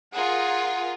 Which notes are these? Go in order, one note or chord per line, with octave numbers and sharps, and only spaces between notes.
F4 G#4 A#4 F#5